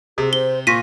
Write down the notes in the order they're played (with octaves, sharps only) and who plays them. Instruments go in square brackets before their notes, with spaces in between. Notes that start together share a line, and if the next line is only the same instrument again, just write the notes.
[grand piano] C3 [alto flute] G#4
[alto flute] C5 [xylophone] G7
[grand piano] A#2 [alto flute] C#6 [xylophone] A#6 B6 D#7